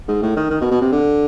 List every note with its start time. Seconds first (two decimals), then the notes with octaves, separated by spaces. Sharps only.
0.08 G#2
0.22 A2
0.36 D#3
0.50 D#3
0.61 B2
0.71 B2
0.82 C3
0.92 D3